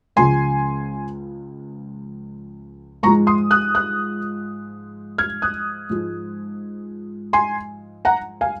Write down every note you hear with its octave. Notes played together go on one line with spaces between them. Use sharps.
C#2 C#3 F3 G#3 G#5 C6
G#2 F3 G#3 A#5 C#6
C6 D#6
D#6 F#6
D#6 F#6
F6 G#6
D#6 F#6
G#2 F3 G#3
G#5 C6
F#5 A#5
F5 G#5